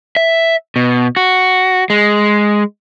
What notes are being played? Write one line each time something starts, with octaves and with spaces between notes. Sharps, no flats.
E5
B2
F#4
G#3